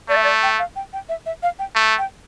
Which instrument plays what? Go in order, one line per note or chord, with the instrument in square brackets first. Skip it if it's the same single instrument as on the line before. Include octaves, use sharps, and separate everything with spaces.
[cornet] A3 [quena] D5
[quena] E5
D5
G5
F5
G5
G5
E5
E5
F5
G5
[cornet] A3
[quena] G5